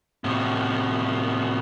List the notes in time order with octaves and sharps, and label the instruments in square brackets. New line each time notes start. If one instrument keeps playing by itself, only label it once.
[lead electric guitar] A2 C3